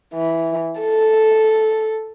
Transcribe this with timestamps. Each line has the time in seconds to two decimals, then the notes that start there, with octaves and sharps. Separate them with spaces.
0.14 E3
0.80 A4